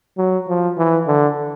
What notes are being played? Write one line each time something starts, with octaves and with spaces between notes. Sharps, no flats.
F#3
F3
E3
D3